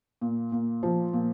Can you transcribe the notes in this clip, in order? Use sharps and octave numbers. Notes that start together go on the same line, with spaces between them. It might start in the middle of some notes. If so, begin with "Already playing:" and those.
A#2
A#2
F3
A#2